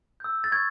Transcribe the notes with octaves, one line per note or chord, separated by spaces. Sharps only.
E6 G6
A6
C#6 G#6